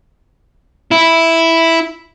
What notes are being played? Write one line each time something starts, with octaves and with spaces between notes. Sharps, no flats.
E4